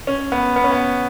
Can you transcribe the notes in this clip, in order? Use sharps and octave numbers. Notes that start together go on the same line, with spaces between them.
C#4
B3
B3
C#4
B3